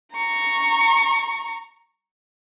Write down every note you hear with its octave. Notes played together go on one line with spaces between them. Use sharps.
A#5 C#6